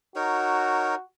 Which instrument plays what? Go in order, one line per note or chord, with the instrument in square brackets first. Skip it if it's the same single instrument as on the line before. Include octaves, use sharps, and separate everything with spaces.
[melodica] D#4 A#4 C#5 [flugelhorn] F#4